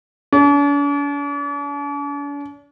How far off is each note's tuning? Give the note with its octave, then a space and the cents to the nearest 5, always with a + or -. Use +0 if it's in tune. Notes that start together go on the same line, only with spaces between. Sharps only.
D4 -45